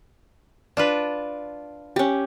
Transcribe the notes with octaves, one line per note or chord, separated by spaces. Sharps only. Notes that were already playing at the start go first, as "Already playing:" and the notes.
D4 F4 B4
C#4 G4